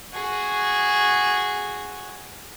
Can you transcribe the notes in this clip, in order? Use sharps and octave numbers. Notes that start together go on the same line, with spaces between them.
F#4 G#4